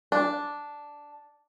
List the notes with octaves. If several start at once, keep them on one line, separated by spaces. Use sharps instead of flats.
D4